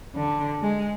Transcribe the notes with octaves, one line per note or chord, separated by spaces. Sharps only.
D3
G#3